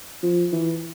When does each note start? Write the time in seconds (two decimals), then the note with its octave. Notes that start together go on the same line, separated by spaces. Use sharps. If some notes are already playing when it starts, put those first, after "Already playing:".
0.23 F3
0.53 E3